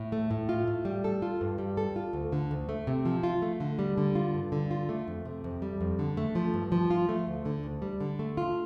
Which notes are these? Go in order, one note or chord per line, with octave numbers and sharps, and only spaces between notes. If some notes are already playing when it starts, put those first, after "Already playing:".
Already playing: A2
A3
A2
F4
A2
G3
A4
F4
G2
G3
A4
F4
D2
D3
D2
A3
C3
F3
F4
A3
D3
G3
D3
F4
G2
D3
F4
A3
F2
C3
F2
G3
F2
D3
A3
F3
G2
F3
F4
A3
D2
D3
D2
G3
D3
A3
F4